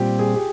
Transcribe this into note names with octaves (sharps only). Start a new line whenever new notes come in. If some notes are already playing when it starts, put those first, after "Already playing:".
Already playing: A#2 G3 C4 F4 G4
G#4
G4